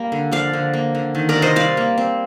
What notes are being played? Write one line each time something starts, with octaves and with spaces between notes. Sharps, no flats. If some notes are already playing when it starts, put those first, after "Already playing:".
Already playing: G3 A#3
D3
F3 D5 F5
D3
A#3
D3
D#3
A#4 D5
C3
C5 D#5
G3 D5 F5
A#3
C4